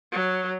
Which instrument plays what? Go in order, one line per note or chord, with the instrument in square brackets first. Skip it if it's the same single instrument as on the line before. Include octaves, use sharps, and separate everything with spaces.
[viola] F#3